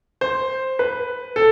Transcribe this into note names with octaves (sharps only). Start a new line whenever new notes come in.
C5
B4
A4